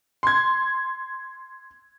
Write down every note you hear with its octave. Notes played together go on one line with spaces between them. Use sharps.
C6 G#6